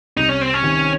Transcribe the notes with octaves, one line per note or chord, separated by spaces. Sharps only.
C2 D#4
C#4
C4
C#4
C3 D#3